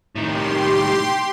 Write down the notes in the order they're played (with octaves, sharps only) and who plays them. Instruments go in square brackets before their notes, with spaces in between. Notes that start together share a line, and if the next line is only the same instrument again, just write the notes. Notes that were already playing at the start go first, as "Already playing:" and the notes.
[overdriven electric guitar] A2 D#3 [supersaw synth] G4 C6